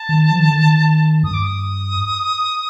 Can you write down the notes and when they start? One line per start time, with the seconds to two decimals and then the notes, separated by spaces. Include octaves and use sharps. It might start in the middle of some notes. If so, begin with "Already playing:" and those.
Already playing: A5
0.09 D#3
0.31 F3
0.39 D#3
0.47 D3
0.56 D#3
1.23 G2 D#6
1.34 D6
1.44 D#6